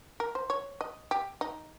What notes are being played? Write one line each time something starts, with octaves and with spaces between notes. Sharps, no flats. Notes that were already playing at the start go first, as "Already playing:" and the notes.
A#4
C5
C#5
D#5
G4
D#4